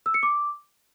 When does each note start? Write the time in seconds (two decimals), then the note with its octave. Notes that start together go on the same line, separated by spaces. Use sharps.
0.06 E6
0.14 C#7
0.23 D6